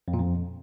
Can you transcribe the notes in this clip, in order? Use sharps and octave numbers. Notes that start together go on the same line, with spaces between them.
F2
A#2
F2